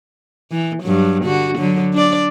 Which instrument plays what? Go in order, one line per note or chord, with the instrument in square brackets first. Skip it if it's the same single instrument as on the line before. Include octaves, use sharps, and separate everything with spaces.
[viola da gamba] E3
G2 F#3
D3 F#4
D3 F#3
D4 D5